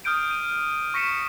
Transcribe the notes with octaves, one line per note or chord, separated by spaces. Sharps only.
D#6 F6 G6 D7 D#7
D#7
C#6 A#6 B6 C#7 D#7 E7